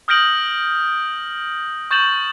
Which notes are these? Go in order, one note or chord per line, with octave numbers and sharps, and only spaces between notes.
D#6 F6 G6 A#6 D7 F#7
C#6 G6 A6 E7 F#7